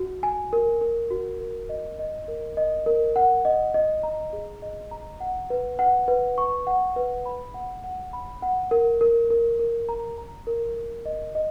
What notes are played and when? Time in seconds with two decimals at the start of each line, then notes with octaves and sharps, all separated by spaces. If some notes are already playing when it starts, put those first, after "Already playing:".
Already playing: F#4
0.23 G#5
0.53 A#4
0.81 A#4
1.10 F#4
1.40 A#4
1.69 D#5
1.99 D#5
2.28 A#4
2.57 D#5
2.86 A#4
3.16 F#5
3.45 D#5
3.74 D#5
4.03 A#5
4.33 G#4
4.62 D#5
4.91 A#5
5.20 F#5
5.50 B4
5.79 F#5
6.08 B4
6.38 C#6
6.67 F#5
6.96 B4
7.26 B5
7.54 F#5
7.84 F#5
8.13 B5
8.42 F#5
8.71 A#4
9.01 A#4
9.30 A#4
9.59 A#4
9.89 A#5
10.18 A#5
10.47 A#4
10.76 A#4
11.05 D#5
11.35 D#5